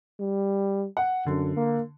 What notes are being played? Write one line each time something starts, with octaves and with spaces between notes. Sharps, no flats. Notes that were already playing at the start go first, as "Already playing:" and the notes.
G3
F#5
F#2 D3
A#3